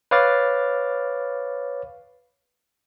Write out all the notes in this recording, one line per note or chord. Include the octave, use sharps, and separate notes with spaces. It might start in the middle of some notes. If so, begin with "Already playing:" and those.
B4 C#5 F5 D6 F6 A6